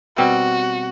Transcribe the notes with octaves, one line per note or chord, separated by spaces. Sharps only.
B2 G3 C4 F#4